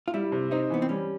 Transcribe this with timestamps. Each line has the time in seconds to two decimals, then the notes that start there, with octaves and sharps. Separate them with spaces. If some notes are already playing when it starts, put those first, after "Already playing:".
0.08 F4
0.14 G3 E4
0.32 C3
0.51 C4 D#4
0.70 E3 B3
0.82 C4
0.89 G3 C#4